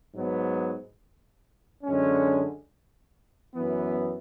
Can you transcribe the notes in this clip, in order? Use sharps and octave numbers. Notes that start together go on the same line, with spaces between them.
G#2 F#3 B3
F#2 D3 G#3 C#4
F#2 E3 B3